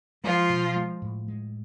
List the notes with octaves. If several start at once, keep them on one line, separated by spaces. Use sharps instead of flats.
F3 G#3 F4
B2
G#3
A2
G#3